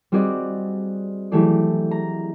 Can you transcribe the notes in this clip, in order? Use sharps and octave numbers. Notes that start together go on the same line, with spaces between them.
G3 C4 F#4 G#4 D5 D#5
E3 F#3 A3 G4 G#4 D5
A#5